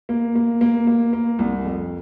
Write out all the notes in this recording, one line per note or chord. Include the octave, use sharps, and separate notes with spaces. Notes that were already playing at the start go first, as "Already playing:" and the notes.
A#3
A#3
A#3
A#3
A#3
C2
F2